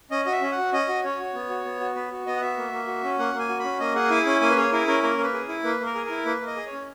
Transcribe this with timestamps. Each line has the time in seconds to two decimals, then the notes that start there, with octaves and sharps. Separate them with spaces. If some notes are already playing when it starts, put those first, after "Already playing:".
0.11 C#4 D#5
0.25 F#4 D#5
0.32 E5
0.42 C#4
0.52 F#5
0.58 F#4
0.72 C#4 D#5
0.88 F#4
1.03 C#4 C#5
1.19 F#4
1.34 B3
1.50 F#4
1.65 B3
1.80 F#4
1.95 B3 B4
2.11 F#4
2.26 B3 D#5
2.36 F#5
2.41 F#4 E5
2.57 A#3
2.72 A#3
2.87 F#4
3.04 C#4
3.19 A#3 F#5
3.33 A#3
3.39 G#5
3.49 F#4
3.59 C#4 B5
3.80 A#3 D#5
3.95 G#4 F#5
4.10 E4 G#5
4.26 C#4 G#5
4.41 A#3 G#5
4.50 B4
4.57 G#4 C#5
4.73 E4 A#4
4.87 C#4 A#4
5.03 A#3 A#4
5.18 A#3
5.23 B4
5.33 G#4
5.49 E4
5.64 A#3 B4
5.80 A#3
5.85 A#4
5.95 G#4
6.06 E4 A#4
6.25 A#3 B4
6.41 A#3
6.46 D#5
6.56 G#4
6.66 C#5
6.72 C#4